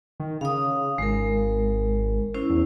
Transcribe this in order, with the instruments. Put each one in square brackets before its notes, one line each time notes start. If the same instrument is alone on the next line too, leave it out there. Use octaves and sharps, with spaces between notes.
[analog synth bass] D#3
[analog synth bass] C#3 [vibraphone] F5 D#6
[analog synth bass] G#1 [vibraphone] G#3 A#4
[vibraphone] C#4 E4 C5
[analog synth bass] E2